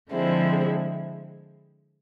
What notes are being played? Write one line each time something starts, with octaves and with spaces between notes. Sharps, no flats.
D3 F3 G#3 C4 E4